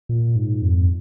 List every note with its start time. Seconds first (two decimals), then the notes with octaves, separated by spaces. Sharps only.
0.09 A#2
0.36 G#2
0.62 F2